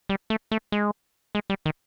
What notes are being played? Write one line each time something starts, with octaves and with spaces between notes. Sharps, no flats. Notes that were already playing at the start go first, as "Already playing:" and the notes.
G3
A3
A3
G#3
G#3
G3
D#3